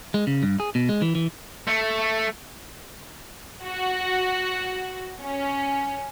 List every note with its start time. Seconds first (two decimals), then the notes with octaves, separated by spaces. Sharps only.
0.14 G#3
0.27 C#3
0.43 G2
0.60 G#4
0.75 B2
0.89 G#3
1.02 E3
1.15 E3
1.68 A3
3.63 F#4
5.21 C#4